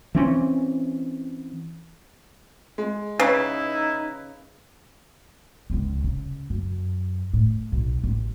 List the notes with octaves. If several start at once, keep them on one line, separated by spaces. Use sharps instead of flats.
E3 C4 C#4
G#3
C#3 D#4 E4 B4
C#2 G#3
C#3
F#2
A2
B1
A1